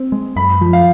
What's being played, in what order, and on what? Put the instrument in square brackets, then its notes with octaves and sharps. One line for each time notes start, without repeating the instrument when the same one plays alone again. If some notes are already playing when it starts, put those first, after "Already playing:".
Already playing: [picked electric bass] C4
G#3
[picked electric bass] F#2 [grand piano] B5
[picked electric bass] F3
[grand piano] F5